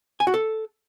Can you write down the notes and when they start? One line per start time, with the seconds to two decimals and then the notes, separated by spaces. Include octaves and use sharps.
0.20 G#5
0.27 F#4
0.34 A4